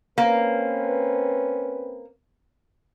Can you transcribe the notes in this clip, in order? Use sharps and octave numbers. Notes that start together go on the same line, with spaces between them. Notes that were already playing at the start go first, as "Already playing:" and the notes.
A#3 C4 C#4 B4